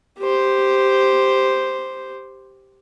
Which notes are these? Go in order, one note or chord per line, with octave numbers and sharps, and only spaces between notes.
G4 C5